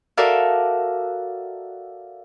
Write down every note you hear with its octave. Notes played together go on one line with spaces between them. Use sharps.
F#4 A4 A#4 D5 E5 F5